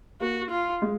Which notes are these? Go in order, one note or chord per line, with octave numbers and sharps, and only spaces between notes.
A#3 F#4
F4
G#3